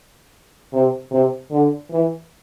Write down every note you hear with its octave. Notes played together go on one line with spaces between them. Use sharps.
C3
C3
D3
E3